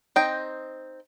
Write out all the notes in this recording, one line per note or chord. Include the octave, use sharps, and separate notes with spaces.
C4 D#4 D#5 G5